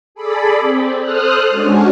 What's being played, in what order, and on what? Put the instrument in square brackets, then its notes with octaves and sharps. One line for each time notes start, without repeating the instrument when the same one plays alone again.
[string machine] G#4 A4 D5 B5
C4
A4 C5 D#6 F6 F#6
G#3 C#4 D4 F#4